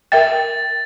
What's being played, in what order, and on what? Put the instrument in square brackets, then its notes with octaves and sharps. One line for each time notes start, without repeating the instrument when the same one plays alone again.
[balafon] A#4 E5 G5 [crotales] A6